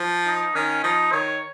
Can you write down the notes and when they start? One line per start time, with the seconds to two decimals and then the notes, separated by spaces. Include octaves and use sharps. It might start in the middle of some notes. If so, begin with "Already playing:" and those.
Already playing: F3
0.27 D#4
0.55 D#3 C#4
0.84 F3 D#4
1.12 D#3 C#5